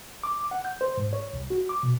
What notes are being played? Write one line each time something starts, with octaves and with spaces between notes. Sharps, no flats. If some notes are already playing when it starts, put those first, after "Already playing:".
D6
F#5
G6
C5
G#2
C#5
C2
F#4
D6
B2